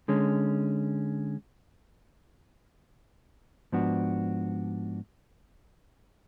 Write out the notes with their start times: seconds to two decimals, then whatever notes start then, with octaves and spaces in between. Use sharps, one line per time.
0.08 D3 G#3 C#4
3.72 G#2 F3 B3 D4 F#4